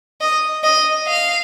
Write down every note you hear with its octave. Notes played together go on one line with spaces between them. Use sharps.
D#5
D#5
F5